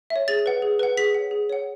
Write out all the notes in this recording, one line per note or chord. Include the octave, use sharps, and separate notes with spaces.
E5
C#5
G#4 A6
B4 F#5
G#4
B4 F#5
G#4 B6
C#5 F#5
G#4
C#5 F#5